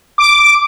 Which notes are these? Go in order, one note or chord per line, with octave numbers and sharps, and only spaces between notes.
D6